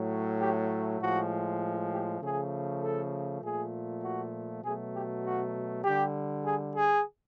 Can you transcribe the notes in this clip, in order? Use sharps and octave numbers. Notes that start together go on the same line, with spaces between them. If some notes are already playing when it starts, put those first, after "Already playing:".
Already playing: A2 F#3 A3
G4
A2 F3 G#3 F#4
G4
C#3 F3 A3 G#4
A4
A#2 F3 A3 G#4
F#4
B2 F#3 A3 G#4
G4
F#4
D3 G3 G4
G#4
G#4